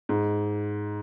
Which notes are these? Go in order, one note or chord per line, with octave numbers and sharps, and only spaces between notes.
G#2